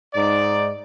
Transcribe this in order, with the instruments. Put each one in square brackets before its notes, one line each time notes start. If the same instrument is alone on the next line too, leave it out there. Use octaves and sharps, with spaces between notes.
[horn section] G#2 D#4 D5